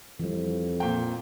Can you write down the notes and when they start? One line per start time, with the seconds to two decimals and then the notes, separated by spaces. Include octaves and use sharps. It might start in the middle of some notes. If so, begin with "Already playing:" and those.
0.19 F2 E3 G3
0.80 A#2 G5